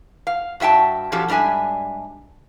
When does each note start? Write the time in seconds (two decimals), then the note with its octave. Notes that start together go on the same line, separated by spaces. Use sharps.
0.27 F5
0.60 G2 F#4 E5 G5 A5
1.12 A#2 F3 F#3 C#4 G4 A4
1.28 G#2 G3 D4 E5 G#5